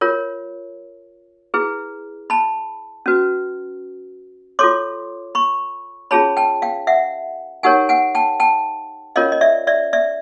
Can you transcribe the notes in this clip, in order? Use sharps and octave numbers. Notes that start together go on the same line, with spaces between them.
F4 A#4 C#5
E4 G#4 B4
A5 B5
C#4 F#4 B4
F4 A4 C#5 C6 D6
B5 C#6
C#4 F4 G#4 C#5 A5 B5
G5 A5
F5 G5
E5 F#5
D#4 G4 A#4 C#5 F#5 G#5
F#5 G#5
G5 A5
G5 A5
C#4 F4 A#4 C#5 D#5 F5
D#5
D5 E5
D5 E5
D5 E5